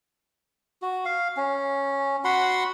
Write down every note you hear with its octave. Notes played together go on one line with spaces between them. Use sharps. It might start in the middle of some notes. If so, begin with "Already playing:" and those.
F#4
F5
C#4
F#4 F#5 B5 C6